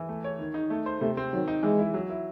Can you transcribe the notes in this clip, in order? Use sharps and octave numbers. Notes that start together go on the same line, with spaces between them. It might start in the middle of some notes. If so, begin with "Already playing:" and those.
Already playing: E3
A3
C#5
D#3
D#4
A3
C5
C3 A3
C4
D#3 F#3
D#4
E3 G#3
E4
F#3
E4